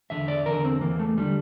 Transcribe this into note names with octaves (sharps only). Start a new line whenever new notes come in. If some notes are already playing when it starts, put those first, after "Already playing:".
E2 D3 E5
D5
E2 D3 A#4
C4
E2 E3 A#3
A3
D3 G3